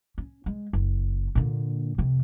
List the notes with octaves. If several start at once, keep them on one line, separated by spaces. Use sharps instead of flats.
C#4
G#3
F#1
A#2 D3
F2 C3